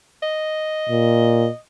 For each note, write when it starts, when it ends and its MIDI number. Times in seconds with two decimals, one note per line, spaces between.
0.23 1.57 75
0.89 1.48 46